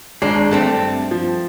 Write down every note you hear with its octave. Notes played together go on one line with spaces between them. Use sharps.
G#1 G#3 D4 C7
G2 A3 C4 A5
F3